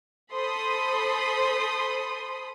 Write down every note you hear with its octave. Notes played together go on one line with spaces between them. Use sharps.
A4 C5 B5 C6 D#6